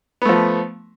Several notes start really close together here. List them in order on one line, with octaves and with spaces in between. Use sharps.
B3 A3 F3